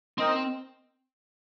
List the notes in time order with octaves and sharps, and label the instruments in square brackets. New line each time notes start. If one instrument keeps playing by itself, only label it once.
[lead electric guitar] C4 [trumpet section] D#4 A#4 D#5 G5